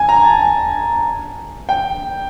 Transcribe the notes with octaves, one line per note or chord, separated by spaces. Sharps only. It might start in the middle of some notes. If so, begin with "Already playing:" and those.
Already playing: G#5
A#5
A5
G#5
G5